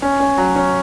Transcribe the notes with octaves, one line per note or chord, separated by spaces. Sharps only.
C#4
C#4
F#3
C#4